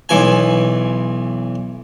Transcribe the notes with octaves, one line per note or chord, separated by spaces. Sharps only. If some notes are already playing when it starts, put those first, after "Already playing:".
B1 E3 G#5